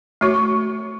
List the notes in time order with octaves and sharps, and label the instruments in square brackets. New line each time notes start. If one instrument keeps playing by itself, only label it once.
[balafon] A3 F#4 C#5 [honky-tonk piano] C#6